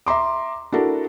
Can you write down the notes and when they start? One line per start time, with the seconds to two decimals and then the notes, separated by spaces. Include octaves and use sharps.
0.06 E5 A#5 C6 D6
0.72 D4 E4 F#4 A4 A#4